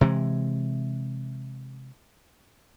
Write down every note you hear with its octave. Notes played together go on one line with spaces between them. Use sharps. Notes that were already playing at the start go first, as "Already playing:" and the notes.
C3 E3 G#3